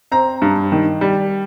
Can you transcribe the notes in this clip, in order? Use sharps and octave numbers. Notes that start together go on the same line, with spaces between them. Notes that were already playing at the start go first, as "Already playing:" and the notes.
C4 A#5
G2
D#3
G3